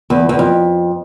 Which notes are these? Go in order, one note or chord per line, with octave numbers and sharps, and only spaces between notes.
E2
E2
F2